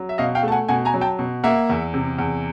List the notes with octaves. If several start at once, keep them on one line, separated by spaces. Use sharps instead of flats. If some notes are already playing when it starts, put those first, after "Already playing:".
Already playing: F#3
E5
B2 D#5 F5
F5 G5
A3 A5
F#5 G#5
B2 F#5 G#5
G#5 A#5
F#3
G5 A5
B2
A#3 E5 F#5
E2
C3
E2